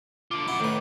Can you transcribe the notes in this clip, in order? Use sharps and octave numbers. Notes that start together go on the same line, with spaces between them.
D3 F4 D6
C#4 E4 F#5
A2 D#3 B4